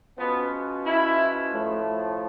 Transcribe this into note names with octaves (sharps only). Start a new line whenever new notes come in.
F3 G#3 B3 C#4 F#4 B4
E4
A2 F3 A3